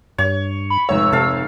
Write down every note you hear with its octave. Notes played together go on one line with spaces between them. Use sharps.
G2 C#5
B5
F1 G#2 C#5 E6
C3 A4 F5